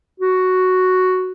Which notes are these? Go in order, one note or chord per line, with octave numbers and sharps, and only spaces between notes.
F#4